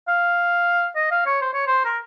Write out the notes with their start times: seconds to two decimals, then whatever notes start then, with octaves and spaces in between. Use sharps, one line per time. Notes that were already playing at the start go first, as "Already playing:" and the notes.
0.08 F5
0.96 D#5
1.11 F5
1.26 C#5
1.41 C5
1.53 C#5
1.67 C5
1.85 A#4